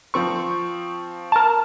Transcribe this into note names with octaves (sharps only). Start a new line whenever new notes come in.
F3 C4 C#6
A#4 A5